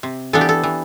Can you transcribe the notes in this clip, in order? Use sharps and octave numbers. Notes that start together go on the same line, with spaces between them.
C3
E3 B3 D4 A4
G4
A4
E3